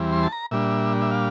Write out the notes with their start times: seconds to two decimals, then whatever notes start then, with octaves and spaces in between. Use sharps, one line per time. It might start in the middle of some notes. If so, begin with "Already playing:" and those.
Already playing: E2 E3 G3 C4
0.12 C6
0.23 A5
0.32 A#5
0.51 A#2 G3 D4 E5
1.02 E5
1.11 F5